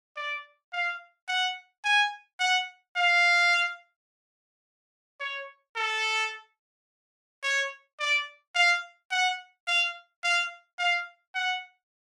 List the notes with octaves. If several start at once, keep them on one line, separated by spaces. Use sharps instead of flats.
D5
F5
F#5
G#5
F#5
F5
C#5
A4
C#5
D5
F5
F#5
F5
F5
F5
F#5